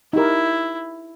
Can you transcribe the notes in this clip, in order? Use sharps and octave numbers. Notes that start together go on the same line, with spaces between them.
D#4 E4 G4 A#4